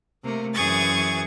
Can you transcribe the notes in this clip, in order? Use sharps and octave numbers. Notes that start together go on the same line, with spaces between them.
C3 A3 A#3
F#2 E3 G#4 C#6 G#6 A6